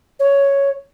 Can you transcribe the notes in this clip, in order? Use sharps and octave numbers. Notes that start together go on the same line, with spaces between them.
C#5